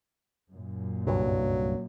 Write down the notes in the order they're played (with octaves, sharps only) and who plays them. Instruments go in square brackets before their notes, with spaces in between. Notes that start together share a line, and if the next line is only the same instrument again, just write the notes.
[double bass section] F#2 A#2
[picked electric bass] C2 G2 [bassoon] F#3